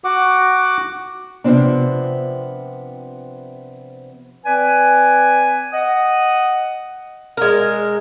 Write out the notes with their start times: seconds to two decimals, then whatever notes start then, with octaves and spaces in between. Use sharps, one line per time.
0.04 F#4 F#5 D6
1.44 C3 F3 B3 C4 D4
4.45 C4 B4 D5 G#5
5.73 D#5 F#5 D#6
7.37 G#3 A#4